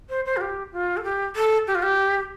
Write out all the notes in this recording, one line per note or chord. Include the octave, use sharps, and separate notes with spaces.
C5
C5
F4
G4
F4
A4
G4
A4
G4
F4
G4